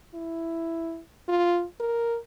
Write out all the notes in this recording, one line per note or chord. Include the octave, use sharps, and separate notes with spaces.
E4
F4
A#4